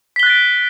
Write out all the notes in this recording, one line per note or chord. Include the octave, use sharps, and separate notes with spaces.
F#6 A6 B6 D7 G7